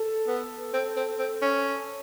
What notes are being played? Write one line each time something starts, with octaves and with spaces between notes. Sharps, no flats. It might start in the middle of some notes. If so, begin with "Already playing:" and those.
Already playing: A4
B3
C4
C4
C4
C#4